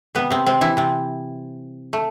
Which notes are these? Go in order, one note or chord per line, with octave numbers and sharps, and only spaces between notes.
C3 G3 B3 B4
C3 C4
C3 C4
E3 E4
C3 C4
A3